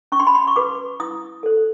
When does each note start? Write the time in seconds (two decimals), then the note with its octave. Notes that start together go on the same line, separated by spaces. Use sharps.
0.12 C#4 C#6
0.20 C6
0.27 B5
0.35 C6
0.47 C#6
0.56 F#4 B4 D6
1.00 E4 D#6
1.43 A4 C5